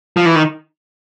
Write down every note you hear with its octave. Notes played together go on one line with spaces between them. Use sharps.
F3
E3
D#3